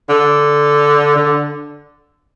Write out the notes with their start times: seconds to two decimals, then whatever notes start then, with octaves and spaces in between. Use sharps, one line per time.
0.09 D3
1.16 D3